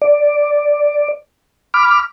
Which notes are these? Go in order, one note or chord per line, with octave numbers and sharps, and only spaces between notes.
D5
B5 D6 F6